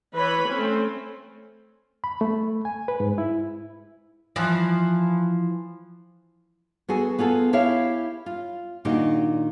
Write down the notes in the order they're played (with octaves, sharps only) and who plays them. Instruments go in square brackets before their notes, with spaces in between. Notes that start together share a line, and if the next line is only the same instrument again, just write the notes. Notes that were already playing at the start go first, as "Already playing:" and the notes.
[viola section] E3 B4 C#5 B5
A3 C4 C#4
[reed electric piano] B5
A3
G#5
B4
G#2
E4
[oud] E3 F3
[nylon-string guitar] B3 F#4 G#4 A4
B3 F4 G#4 A4
E4 G4 C#5 E5 F5
F4
A#2 D#3 D4 D#4 F#4 G4